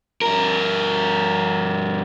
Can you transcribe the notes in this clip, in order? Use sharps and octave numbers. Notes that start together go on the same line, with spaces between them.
G2 A#4